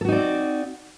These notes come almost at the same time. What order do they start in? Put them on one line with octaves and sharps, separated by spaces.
A4 F#4 D#4 D5 C4